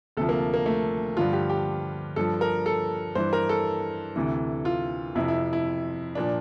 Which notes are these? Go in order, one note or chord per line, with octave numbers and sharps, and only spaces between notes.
D2 C3 F3 A4
A#3
A#3
A3
G2 D3 F3 F4
G4
G4
G2 F3 A4
A#4
A4
G2 E3 C5
A#4
A4
D2 C3 E3
F4
F2 C3 F3 E4
E4
E4
A#2 F3 D4